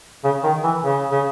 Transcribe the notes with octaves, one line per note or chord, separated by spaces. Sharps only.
C#3
D#3
E3
C#3
C#3